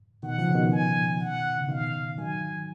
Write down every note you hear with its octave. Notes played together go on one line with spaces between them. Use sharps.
B2 D#3 F#5
C#3 F3
C#3
B2 D#3
G#5
F#5
C#3
B2 D#3 F5
D#3 F#3 G#5